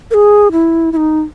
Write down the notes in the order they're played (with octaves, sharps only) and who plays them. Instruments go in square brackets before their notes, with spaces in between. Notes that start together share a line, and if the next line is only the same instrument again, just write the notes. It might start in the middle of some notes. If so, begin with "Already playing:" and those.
[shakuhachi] A#4
G#4
E4
E4
D#4